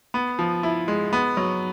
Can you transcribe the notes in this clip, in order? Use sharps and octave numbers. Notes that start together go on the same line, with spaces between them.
B3
F3
E4
G#3
B3
F#3